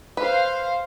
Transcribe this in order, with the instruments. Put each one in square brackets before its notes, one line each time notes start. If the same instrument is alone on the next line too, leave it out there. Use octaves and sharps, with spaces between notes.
[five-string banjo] B4 [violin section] C5 F5